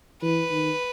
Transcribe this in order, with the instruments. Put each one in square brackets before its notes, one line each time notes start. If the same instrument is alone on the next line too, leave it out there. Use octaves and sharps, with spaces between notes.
[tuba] E3 [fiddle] B4
[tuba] D#3